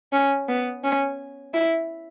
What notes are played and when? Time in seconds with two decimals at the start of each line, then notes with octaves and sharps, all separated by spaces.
0.12 C#4
0.48 B3
0.84 C#4
1.54 E4